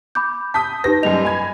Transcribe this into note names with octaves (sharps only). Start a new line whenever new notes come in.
B5 D6 G6
A5 D#6 G6 B6
D#4 G4 B4 A#6
F#2 G3 G4 D#5 F7
G#5 B5 G#6